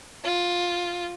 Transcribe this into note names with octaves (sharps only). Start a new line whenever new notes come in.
F4